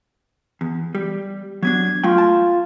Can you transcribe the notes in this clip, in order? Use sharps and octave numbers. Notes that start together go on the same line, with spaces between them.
E2
G3
F#3 B3 D4 G#6
F#3 A3 F4 G5
A5